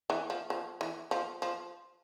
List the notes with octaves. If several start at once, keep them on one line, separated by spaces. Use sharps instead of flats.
E3
F3
F3
E3
F3
F3